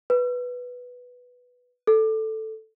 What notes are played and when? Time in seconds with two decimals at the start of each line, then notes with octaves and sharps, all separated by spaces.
0.10 B4
1.87 A4